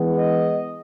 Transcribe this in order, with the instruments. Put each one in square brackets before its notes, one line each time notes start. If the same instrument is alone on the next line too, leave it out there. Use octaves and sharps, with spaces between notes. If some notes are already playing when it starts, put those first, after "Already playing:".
Already playing: [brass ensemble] E3 G#3 B3
D#5